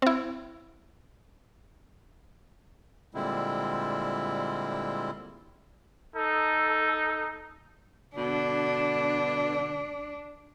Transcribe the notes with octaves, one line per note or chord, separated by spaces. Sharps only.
C4 E4
A#2 D3 G3 G#3 C4 E4
D#4 A4
B2 D3 D4